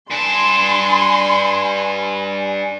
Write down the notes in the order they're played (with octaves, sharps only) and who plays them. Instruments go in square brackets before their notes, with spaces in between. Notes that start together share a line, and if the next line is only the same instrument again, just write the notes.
[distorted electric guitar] G2 A5 [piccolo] G#5 [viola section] C6